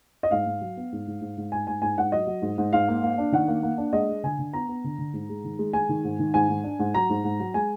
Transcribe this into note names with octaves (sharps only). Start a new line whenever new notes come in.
D#5
G#2 F5
G#2
F#3
B3
G#2
G#2
G#2
G#2
G#2 G#5
G#2 G#5
G#2 G#5
G#2 F#5
F#3 D#5
F#3
G#2
G#2
G#2 F5
A#3
A#3
D4
D#3 F#5
A#3
A#3
D4
G#3 D#5
G#3
D3 G#5
D3
B3 A#5
B3
D3
D3
G#2
G#3
D#3
G#3
G#3 G#5
D#3
G#2
D#3
G#2 G#5
G#2
D4
G#2
F#3 A#5
G#2
G#2
F#3
G#3 G#5